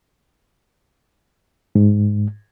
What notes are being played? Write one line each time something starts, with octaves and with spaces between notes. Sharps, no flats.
G#2